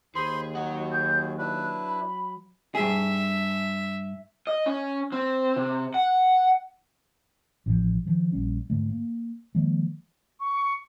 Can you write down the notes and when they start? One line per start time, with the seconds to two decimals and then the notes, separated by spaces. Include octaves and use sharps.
0.15 D#2 G#4 C5 B5 C6
0.55 F#3 D#4 F#5
0.92 G#4 G6
1.38 D4 E4 B4 F#6
1.87 B5
2.75 G2 G#4 E5
4.47 D#5
4.66 C#4
5.12 C4
5.56 C3
5.94 F#5
7.66 A1 A2 D#3 F3
8.06 D#3 F3
8.32 A#1 G3 C#4
8.70 G#2 D3 A3
8.89 A#3
9.55 D#3 F3 G#3 A#3
10.40 C#6